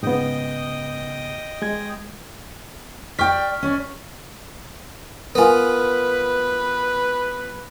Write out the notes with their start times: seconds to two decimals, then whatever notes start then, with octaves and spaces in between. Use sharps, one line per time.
0.03 G#2 C#3 B3 D#5 G5 D#6
1.62 G#3 G#6
3.19 D5 G5 C#6 F6 B6
3.63 C#4 D5
5.35 B3 F4 A#4 B4 G#5